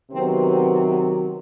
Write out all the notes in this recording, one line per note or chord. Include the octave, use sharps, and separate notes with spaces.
C3 D#3 F#3 B3 C4
C4
B3